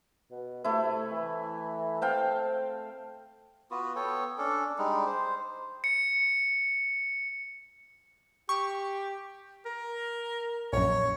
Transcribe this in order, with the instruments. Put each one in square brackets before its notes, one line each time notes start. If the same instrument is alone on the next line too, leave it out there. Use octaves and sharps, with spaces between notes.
[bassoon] B2
[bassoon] C3 [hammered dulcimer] A3 E4
[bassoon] E3
[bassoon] C4 [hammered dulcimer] F5 G5 A5
[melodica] B3 F4 F#4 B4
B3 A4 C#5 G5
C#4 D4 A4
G3 G#3 D4 D#4
C5
[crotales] C#7
[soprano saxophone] G4 [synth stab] C#6
[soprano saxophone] A#4
[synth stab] A#1 F#2 [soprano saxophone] C#5